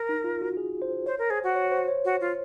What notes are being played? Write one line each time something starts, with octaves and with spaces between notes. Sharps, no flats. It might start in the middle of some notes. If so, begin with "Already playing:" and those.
Already playing: A#4
D#4
F4
F#4
G#4
C5
C5 C#5
A#4
G#4 C5
F#4
C#5
C5
C#5
F#4
F4